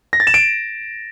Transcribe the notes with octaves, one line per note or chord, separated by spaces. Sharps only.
A#6
A6
E7
D7